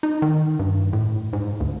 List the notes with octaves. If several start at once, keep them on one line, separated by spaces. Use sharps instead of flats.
D#4
D#3
G2
A2
G#2
D2